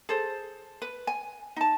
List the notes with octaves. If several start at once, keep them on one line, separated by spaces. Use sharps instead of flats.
G#4 A4 C5
B4
G#5
D#4 A5